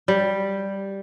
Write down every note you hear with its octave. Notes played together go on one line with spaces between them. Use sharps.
G3